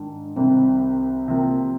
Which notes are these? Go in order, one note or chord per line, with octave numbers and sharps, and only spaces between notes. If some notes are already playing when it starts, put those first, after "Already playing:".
Already playing: G#2 D#3 D4
C2 C3 D#3 C4
C3 F3 A#3